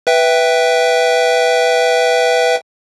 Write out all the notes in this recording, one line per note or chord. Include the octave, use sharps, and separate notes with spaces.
B4 E5 G5